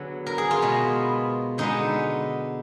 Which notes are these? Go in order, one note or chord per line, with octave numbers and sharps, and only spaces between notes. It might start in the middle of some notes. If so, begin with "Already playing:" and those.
Already playing: D3 F#3 B3 G#4
A#4
G#4
F4
B2 G#3 B3
D3 G#3 B3 D#4